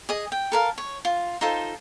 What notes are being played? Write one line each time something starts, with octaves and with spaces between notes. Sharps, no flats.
G#4 D#5
G5
A4 A#4 F5
C#5
F4
D#4 F4 A4 C5